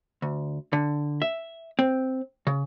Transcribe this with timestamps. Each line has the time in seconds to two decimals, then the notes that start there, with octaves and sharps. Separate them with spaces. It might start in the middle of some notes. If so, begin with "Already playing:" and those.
0.22 D2
0.73 D3
1.22 E5
1.79 C4
2.47 C#3